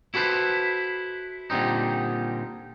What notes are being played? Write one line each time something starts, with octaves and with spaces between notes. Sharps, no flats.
E4 F#4 A4 B4 C5
A#2 D3 G3 C4 D#4